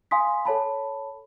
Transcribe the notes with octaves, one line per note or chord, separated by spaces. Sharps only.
F5 G#5 C6 D#6 B6
A4 C#5 A5 B5